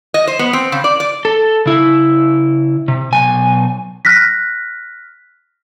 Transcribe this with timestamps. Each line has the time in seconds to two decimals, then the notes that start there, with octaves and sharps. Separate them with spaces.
0.14 D#5
0.27 C5
0.39 B3
0.53 C4
0.72 C#3
0.84 D5
1.00 D5
1.25 A4
1.66 C#3 E4
2.88 C3
3.13 B1 G#5
4.05 F6 F#6 A#6 B6